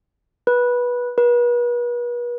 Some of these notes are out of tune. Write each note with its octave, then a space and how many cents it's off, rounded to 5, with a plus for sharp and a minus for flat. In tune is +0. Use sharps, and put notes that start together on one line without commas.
B4 -15
B4 -40